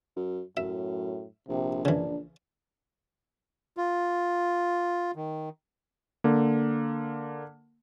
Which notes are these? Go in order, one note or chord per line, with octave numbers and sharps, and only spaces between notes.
F#2
F#2 A2 E5
A#1 C3
C#3 E3 D4
F4
D#3
D3 A#3